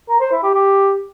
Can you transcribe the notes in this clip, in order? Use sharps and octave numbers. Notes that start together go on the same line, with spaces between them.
A#4
C5
E4
G4
G4